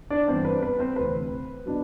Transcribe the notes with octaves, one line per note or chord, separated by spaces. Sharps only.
D4 D5
G2 E3 G3 B3 C4 D4 C5
B4
B4
C4 C5
D2 C3 E3 B4
B2 F#3 B3 D4